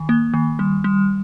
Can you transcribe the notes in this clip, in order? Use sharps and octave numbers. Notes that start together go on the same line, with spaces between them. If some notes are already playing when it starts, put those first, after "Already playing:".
Already playing: D#3
A#3
D#3
G3
G3